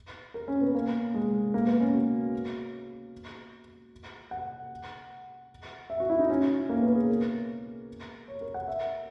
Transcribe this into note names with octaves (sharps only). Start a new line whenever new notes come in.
A#4
C#4
B3
A#3
G#3
A#3
B3
C#4
F#4
F#5
E5
F#4
E4
D#4
C#4
A#3
B3
G#4
A#4
C#5
A#4
F#5
E5